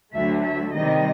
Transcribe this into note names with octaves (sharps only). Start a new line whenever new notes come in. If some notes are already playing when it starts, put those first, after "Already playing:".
D2 D3 F#3 A3 E5
E5
C3 D#3 G3 D#5